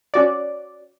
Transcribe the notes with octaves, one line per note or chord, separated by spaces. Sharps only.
C#4 F#4 D5